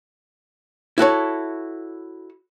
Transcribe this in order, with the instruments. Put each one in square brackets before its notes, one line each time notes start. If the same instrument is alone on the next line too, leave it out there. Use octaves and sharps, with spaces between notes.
[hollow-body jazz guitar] E4 F#4 A4 C#5